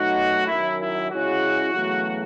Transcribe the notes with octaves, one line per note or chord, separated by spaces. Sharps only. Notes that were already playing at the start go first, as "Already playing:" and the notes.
Already playing: B2 F#3 A3 D#4 F#4
F#2 D#3 F#3 E4
E4
C#3 G#3 C#4 E4 F#4
E2 C#3 F#3 A3